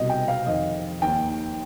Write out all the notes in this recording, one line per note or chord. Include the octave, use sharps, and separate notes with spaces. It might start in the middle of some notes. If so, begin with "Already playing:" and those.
Already playing: C2 B2 D#5
G5
F5
F2 D#3 D#5
D#2 D#3 G5